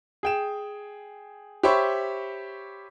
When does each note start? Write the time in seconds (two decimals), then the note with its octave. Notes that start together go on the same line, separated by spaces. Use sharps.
0.23 G#4 G5 E7
1.63 G4 C5 C#5 E5 B5 C#6